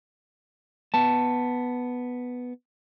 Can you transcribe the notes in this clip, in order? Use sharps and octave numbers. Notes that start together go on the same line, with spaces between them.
B3 A5